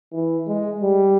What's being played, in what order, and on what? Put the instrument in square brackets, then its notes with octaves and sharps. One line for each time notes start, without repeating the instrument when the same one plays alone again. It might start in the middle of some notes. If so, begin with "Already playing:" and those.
[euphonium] E3
G#3
G3